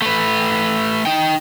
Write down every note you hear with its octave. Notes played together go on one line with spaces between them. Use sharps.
A3 B4
D#4 G5